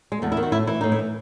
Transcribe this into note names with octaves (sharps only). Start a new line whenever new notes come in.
G#3
E2 A3
E4
D#3
F#4
A2 E4
E3 E4
A2 D#4
E4
E3